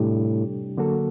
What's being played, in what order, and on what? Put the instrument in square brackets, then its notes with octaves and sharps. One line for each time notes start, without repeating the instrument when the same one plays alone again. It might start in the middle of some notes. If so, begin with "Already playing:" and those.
Already playing: [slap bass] A2 [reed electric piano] C3 G3 D4 G4
[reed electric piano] D3 F#3 A#3 F#4 A4